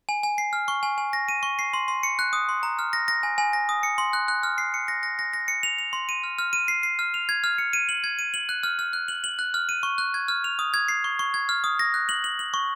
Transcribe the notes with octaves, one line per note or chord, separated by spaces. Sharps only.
G#5
G#5
C7
F6
C#6
G#5
G#5
A#6
D#7
C#6
C7
C6
C6
C#7
F#6
D#6
C6
A#5
F6
A#6
A#6
G#5
G#5
A#6
D#6
C#7
C6
F#6
F#6
F6
C7
C#7
A#6
A#6
A#6
A#6
C#7
F7
F7
C6
D#7
F6
F6
D#7
C7
C7
F6
F7
G#6
F6
C#7
D#7
F#7
G#6
D#7
F#7
F#6
F6
F6
F#6
F#7
F#7
F#6
F6
D#7
C#6
F#6
G#6
F6
F7
D#6
G#6
C7
C#6
C#6
G#6
F6
D#6
A#6
F#6
F#7
F#7
F#7
C#6